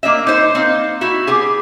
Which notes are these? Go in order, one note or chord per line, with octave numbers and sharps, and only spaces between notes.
A#3 D4 D#5 E5
D#4 C5
A#3 C4 D#4
E4 F#4 E5
B3 G4 G#4